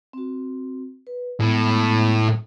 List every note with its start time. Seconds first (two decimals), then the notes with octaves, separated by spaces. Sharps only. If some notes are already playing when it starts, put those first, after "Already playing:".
0.13 C4 F#4
1.07 B4
1.41 A2 G#3 B3